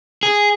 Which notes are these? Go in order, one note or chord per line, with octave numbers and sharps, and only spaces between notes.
G#4